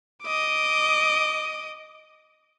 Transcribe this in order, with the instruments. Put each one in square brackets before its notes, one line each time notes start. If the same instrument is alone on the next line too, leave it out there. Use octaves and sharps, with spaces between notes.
[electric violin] D#5 D6